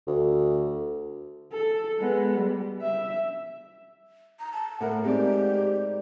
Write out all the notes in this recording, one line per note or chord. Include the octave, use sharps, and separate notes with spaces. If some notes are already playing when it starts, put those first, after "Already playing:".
D2
A4
G#3 B3
G3
E5
A#5
A5
A2 A#4 F#5
G#2 C4 G4 D5